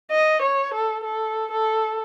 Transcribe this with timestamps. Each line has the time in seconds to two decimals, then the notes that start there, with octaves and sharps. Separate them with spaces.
0.11 D#5
0.42 C#5
0.74 A4
1.04 A4
1.51 A4